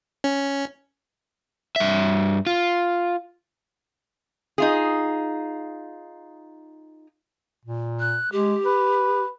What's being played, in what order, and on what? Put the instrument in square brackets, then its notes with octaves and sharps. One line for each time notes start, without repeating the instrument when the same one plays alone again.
[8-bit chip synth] C#4
[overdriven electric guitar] G2 E5
F4
[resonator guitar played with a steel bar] D#4 F4 G#4
[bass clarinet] A#2
[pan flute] F#6
[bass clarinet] G#3 [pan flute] G4
[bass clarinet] B4